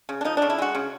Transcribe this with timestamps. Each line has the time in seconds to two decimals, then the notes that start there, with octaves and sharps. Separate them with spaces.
0.09 C#3
0.21 D4
0.25 F3 D#4
0.37 C#3 D4
0.50 E4
0.58 G#3 F#4
0.75 C#3